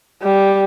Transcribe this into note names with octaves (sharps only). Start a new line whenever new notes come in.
G3